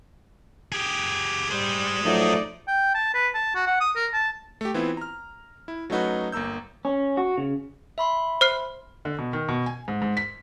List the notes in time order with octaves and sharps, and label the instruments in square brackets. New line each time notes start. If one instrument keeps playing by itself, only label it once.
[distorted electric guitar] G4 G#4
[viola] G3 [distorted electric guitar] G#4 C5
[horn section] F3 F#3 A3 [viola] D#4 D5
[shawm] G5
A5
B4
A5
F#4
F#5
D#6
A#4
A5
[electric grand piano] A3 G4
E3 B3 C4 E4 F4
A#5 F6
E4
F#3 A3 C#4 D#4 F#4 B4
G1 A#3 A#5 E6 G6
[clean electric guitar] C#4
F#4
C#3
[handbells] E5 B5 C6
[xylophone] C5 F6 C7
[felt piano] D3
B2
D#3
B2
G#5
G#2
G#2
B6